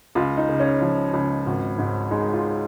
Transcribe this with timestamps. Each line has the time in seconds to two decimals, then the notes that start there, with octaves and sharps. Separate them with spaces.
0.15 C#2 F4
0.37 D#4
0.49 C#3
0.60 C#4
0.81 F3
1.13 C#2
1.46 G#1
1.78 G#2
2.11 G#3 D#4
2.33 F4